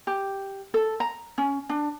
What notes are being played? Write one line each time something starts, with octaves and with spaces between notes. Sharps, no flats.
G4
A4
A#5
C#4
D4